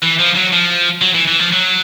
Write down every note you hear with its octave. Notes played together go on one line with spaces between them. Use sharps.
E3
F3
F#3
F3
F#3
E3
E3
F3
F#3